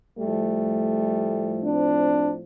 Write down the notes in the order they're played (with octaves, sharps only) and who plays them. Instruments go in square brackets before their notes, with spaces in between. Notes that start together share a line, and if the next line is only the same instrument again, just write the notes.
[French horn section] A2 F3 G3 A3
C4 D4